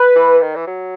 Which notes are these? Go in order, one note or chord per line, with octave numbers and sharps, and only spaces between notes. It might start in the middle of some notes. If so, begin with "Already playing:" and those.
Already playing: B4
E3
D#3
E3
F#3